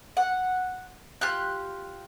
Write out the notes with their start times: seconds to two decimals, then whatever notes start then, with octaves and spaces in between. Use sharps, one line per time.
0.17 F#5
1.21 F4 G4 F#6